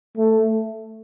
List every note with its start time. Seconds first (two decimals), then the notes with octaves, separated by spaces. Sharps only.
0.17 A3